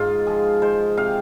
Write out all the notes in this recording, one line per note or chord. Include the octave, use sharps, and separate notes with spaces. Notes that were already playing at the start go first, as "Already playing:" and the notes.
Already playing: G#2 G#3 F4 G#4
F3 G#4
G#3 C5
C3 F5